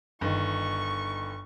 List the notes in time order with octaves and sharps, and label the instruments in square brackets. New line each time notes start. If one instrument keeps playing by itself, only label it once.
[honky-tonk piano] G1 D#3 [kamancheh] C#6